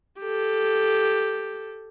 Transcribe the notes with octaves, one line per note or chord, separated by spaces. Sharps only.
G4 A4